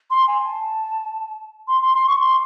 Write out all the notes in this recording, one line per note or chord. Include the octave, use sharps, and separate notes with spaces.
C6
G#5
A5
C6
C6
C6
C#6
C6